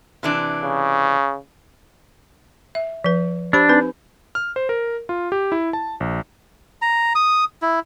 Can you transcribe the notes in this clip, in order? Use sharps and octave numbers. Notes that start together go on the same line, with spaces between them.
C3 E3 D4
C#3
E5
F3 B4
D4 G4 C5 B5
C4 D#4 B4
F6
C5
A#4
F4
G4
E4
A5
A#1
A#5
D#6
E4